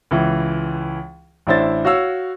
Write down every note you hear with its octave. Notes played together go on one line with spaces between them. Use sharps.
C#2 E3
A1 D4 E4 C5 A6
F#4 C#5 F5 E6